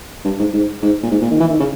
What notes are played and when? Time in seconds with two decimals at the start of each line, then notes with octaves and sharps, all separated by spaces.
0.25 G2
0.39 G#2
0.53 G#2
0.82 G#2
1.03 A#2
1.11 G#2
1.21 A#2
1.31 D#3
1.40 E3
1.51 D#3
1.60 C#3